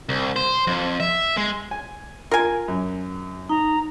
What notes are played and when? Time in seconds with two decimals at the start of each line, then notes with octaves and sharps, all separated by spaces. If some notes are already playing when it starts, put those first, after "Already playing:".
0.09 C2
0.36 C5
0.67 F2
1.00 E5
1.37 G#3
1.71 G#5
2.31 F4 A#4 G#5
2.68 F#2
3.49 D#4 A#5